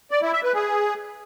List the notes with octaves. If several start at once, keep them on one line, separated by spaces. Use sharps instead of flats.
D5
E4
E5
B4
G#4